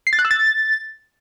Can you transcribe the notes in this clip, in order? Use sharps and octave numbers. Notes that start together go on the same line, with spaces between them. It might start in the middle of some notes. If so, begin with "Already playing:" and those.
C7
A6
F#6
E6
A6